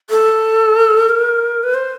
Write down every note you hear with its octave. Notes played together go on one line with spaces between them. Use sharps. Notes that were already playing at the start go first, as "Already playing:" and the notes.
A4
A#4
B4
C5